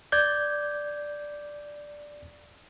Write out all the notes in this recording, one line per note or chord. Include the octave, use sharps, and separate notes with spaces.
D5 G6 G#6